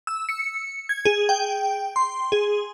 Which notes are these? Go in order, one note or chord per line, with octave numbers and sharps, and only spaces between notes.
E6
C#7
G#6
G#4
G5
C6
G#4